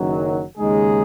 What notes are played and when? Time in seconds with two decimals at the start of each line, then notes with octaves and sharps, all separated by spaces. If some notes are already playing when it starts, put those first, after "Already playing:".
Already playing: F#1 F#2 D#3 F#3
0.58 D#2 C#3 G#3 D#4 G#4